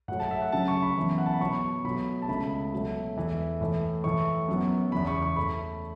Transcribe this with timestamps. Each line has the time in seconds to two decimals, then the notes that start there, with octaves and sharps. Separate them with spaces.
0.08 A2 F#3 A3 F#5
0.20 A5
0.31 E5
0.42 F#5
0.52 F#2 C#3 F#3 A5
0.68 C#6
0.82 B5
0.96 F#2 E3 B3
1.18 F#5
1.26 A5
1.34 B5
1.40 B2 F#3 B3 C#6
1.84 B2 F#3 A3 B5
2.22 A5
2.28 C#2 C#3 A3 B5
2.73 B2 F#3 A3
3.16 E2 E3 A3
3.61 A2 E3 A3
4.04 A2 E3 A3 C#6
4.48 F#2 F#3 B3
4.92 E2 C#3 E3 B5
5.07 C#6
5.22 C#6
5.36 A2 A3 B5